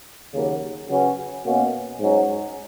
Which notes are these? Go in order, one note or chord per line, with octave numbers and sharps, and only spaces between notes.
D#2 C#3 F#3 A#3
C#3 F#3 C#4 F#4 B4
B2 A#3 C#4 F#4
G#2 F#3 C#4